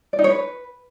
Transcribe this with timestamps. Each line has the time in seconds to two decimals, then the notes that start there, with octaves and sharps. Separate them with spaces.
0.13 D5
0.19 D#4
0.24 C#5
0.30 B4